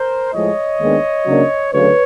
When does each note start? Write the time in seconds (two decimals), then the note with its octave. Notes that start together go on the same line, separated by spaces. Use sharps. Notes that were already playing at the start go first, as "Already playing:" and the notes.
Already playing: A#4 C5
0.34 A2 F3 G#3 C#5 D#5
0.80 D#2 D#3 G#3 B3 D4
1.26 C#3 F#3 A#3 D4
1.73 D2 C#3 F#3 B4 C#5